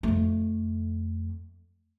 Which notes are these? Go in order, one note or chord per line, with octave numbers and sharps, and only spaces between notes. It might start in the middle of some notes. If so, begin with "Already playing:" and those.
F2 A3